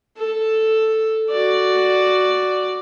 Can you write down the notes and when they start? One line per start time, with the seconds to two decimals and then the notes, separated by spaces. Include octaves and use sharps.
0.17 A4
1.30 F#4 D5